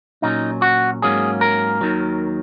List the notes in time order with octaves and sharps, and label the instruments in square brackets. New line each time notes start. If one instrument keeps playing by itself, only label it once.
[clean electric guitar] A#2 F#3 C#4 D#4
F#4
G#2 F#3 A#3 C#4 G#4
A#4
D#2 D#3 F#3